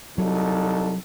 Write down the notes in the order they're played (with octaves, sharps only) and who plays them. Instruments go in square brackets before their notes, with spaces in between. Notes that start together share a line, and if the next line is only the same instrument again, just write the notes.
[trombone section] C2 D#4 A4 [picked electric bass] F#3